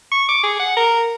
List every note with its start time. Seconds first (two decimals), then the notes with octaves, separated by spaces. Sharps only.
0.12 C#6
0.29 D6
0.43 G#4
0.59 F#5
0.77 A#4